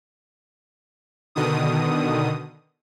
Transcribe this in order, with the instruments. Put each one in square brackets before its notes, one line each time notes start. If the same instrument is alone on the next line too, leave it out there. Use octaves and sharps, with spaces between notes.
[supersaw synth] B2 D3 D#3 D#6